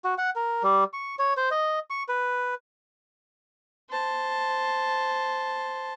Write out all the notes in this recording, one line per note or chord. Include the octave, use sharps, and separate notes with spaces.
F#4
F#5
A#4
G3
C#6
C#5
C5
D#5
C#6
B4
C5 A5